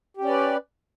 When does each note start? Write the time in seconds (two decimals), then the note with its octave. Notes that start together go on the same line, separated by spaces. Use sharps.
0.17 G4
0.21 C#4
0.25 D5
0.29 B4